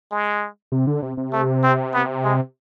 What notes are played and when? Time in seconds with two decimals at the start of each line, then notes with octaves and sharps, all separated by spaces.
0.11 G#3
0.72 C3
0.87 D3
1.02 C3
1.17 C3
1.32 A3
1.63 C4
1.94 B3
2.24 G#3